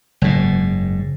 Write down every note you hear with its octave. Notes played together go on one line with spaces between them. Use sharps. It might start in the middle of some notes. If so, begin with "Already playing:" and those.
F#1 G#2